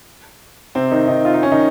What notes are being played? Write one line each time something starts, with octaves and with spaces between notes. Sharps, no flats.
C3 C4
D#3 D#4
D#3 D#4
F4
D#4
C#4
D#3 D#4